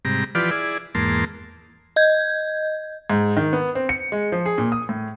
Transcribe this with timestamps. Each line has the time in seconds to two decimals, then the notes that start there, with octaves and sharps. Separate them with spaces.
0.05 G#2 C3 G3 A#5
0.35 E3 F3 F4 G4 B4 D5
0.51 E4 G#4 D5
0.95 E2 G#2 A#3 A5 C6
1.96 D#5 G6 G#6
3.10 G#2
3.37 D#3
3.53 B3
3.75 C4
3.89 C#7
4.12 G#3
4.32 F3
4.46 G#4
4.58 A#2
4.72 D#6
4.89 A2